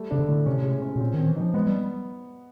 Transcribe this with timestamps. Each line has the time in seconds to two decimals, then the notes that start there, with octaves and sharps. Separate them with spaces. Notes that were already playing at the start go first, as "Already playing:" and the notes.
Already playing: G3 A3
0.11 C#3 D4
0.19 D3
0.29 A2
0.46 C3 C#4
0.64 G#3
0.82 C#4
0.96 B2
1.00 A#2 C4
1.14 D#3 C4
1.28 E3
1.36 F3 D#4
1.54 G#3 B3
1.67 G3